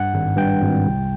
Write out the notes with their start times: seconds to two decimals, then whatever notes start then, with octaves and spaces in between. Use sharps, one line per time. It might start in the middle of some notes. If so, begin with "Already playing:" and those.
Already playing: G2 F#5
0.14 G#1
0.37 G2 G5
0.62 G#1
0.86 C2